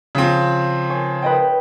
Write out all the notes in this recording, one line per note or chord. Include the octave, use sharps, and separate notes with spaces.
C#3 F3 C4
C#5 G#5
B4 D#5 G5